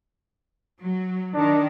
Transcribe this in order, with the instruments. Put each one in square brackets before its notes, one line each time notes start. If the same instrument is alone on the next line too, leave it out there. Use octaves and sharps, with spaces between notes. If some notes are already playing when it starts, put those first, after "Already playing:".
[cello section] F#3
[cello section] D#3 [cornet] D4